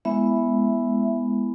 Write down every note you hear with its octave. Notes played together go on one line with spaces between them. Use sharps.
G#3 B3 E4 E5